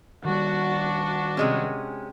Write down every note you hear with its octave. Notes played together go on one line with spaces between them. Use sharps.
D#3 G3 D4 F#4
C3 G#3 C#4